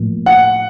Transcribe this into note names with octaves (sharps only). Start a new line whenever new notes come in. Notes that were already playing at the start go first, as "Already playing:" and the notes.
Already playing: A2 F3 A#3
F#5